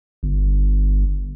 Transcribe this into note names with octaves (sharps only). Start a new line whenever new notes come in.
G1